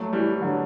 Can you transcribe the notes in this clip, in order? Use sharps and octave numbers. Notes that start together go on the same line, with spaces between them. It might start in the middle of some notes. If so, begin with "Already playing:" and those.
Already playing: F#3 A3
E3 G3
E3
D3 F#3